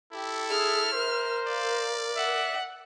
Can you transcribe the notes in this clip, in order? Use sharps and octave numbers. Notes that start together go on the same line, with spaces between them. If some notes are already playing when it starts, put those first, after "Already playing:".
E4 G4 A4
G#4 E5 F6
A#4 C5
D5 F5
E5 F#5